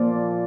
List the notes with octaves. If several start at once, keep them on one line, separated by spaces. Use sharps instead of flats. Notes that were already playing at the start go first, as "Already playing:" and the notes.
Already playing: A#2 F3 D5